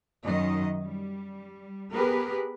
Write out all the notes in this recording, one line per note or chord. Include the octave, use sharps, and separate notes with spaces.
F#2 D#3 D#5
G3
B3 G4 G#4 A#4 B4